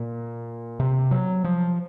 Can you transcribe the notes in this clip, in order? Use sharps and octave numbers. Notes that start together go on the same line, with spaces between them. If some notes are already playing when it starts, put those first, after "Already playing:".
Already playing: A#2
C3
F#3
F3